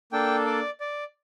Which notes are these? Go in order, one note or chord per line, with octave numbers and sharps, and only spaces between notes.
A#3 D4 A4 G5
D5
D5